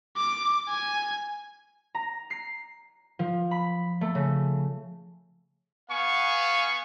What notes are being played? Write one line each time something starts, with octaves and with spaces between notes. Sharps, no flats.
D6
G#5
A#5
C7
F3
B5
A3
C#3
B3 F5 G#5 C#6